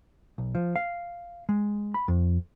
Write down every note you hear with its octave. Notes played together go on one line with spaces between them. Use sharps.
B1
F3
F5
G#3
B5
F2